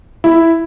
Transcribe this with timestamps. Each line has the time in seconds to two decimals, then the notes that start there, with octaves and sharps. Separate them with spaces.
0.24 E4